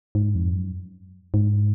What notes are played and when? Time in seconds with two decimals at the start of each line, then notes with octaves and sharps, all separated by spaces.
0.15 G#2
0.35 F2
0.54 F#2
1.34 G#2